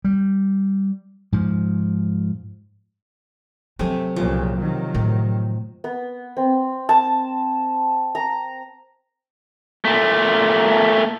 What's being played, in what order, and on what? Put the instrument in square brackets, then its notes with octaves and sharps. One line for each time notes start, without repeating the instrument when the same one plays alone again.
[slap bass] G3
G#2 F3
[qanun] C3 A3 G#5 [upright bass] F#3
[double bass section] C2 A#2 C#3 [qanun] F3
[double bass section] C3 D#3 F#3
[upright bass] A2
[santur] B3
C4
A5
A#5
[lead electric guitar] A#2 A3